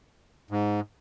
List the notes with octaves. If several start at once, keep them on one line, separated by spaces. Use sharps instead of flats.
G#2